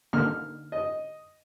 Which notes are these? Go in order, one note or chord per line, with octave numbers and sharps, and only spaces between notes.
D3 A#3 D#4 F6
D#5